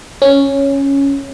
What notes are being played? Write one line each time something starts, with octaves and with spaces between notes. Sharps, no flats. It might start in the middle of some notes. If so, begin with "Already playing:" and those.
C#4